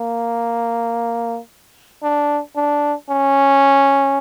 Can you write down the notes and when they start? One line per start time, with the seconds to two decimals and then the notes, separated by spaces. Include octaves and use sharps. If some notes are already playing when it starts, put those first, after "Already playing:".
Already playing: A#3
2.03 D4
2.56 D4
3.10 C#4